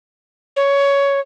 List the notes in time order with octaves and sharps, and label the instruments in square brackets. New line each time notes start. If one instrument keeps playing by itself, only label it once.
[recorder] C#5